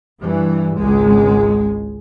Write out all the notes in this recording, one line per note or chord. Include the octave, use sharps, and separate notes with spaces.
G2 E3
G#1 C#2 G#3